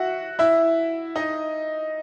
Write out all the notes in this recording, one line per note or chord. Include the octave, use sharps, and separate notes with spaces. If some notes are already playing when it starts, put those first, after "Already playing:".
Already playing: F#4 E5 F#5
E4 E5
D#4 D#5